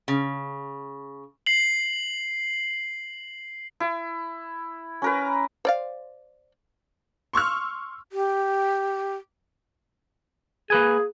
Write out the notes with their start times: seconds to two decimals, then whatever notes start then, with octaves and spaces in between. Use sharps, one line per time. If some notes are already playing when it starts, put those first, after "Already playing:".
0.08 C#3
1.46 C7 F#7
3.80 E4
5.02 C#4 A#4 B4
5.65 C5 D5 F5
7.33 C6 C#6 E6 F6
8.12 G4
10.70 A#3 G#4 B4 G#5